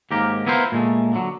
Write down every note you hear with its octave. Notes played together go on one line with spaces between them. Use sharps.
D#2 G#2 A#3 G4 A#4
B3 E4 F4 A#4 C5
A#2 G#3 A3
D3 F#3